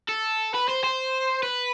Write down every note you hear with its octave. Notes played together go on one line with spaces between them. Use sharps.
A4
B4
C5
C5
B4